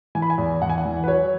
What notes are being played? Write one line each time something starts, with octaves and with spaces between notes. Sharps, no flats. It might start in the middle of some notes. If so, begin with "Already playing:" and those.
E3 G#5
B5
G#5
E2
E2 F#5
G#5
F#5
E3
B4
F#3 C#5